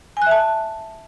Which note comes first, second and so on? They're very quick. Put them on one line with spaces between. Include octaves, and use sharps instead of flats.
G#5 F#6 E5 A5